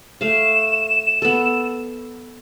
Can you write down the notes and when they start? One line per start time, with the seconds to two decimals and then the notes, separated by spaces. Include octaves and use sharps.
0.21 A3 F5 E7
1.22 B3 A4